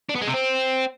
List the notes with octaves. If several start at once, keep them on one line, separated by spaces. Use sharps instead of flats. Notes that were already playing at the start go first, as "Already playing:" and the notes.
D4
B3
G#3
C3
C4